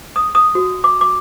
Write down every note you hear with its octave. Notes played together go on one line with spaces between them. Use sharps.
D#6
D#6
F#4
D6
D6